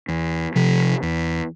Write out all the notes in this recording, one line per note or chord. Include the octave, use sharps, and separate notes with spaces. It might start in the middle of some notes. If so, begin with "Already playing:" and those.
E2
C3 F3
E2